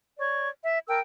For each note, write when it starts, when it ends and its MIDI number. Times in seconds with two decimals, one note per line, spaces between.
0.19 0.49 73
0.19 0.49 74
0.19 0.49 85
0.63 0.78 76
0.87 0.99 70
0.87 0.99 79
0.87 0.99 81
0.87 0.99 88